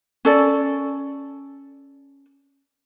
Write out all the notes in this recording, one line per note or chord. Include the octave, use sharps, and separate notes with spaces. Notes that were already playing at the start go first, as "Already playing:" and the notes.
C#4 A4 D5